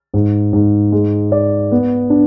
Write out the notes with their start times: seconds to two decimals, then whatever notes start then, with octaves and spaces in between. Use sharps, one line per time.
0.14 G#2
0.53 G#2
0.92 G#3
1.32 D5
1.72 B3
2.10 D4